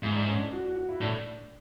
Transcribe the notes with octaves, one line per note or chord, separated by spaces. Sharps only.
G#2 E4
D4
C#4
D4
F#4
F#4
F#4
E4
A2 D4